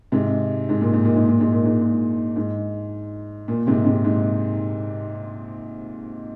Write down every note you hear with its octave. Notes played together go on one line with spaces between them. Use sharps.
G#2 C3
G#2
A#2
G#2
A#2
G#2
A#2
G#2
A#2
G#2
A#2
G#2
A#2
G#2 C3
G#2 C3
G#2